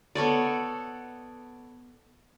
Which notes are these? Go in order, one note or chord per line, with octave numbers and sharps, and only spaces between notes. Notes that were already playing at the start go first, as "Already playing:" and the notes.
B3 A4 C#5 D5